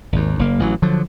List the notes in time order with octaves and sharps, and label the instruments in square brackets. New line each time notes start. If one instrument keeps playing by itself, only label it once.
[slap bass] G#1 D#2
F#1 A#3
A1 E3 F#3
D3 F3 F#3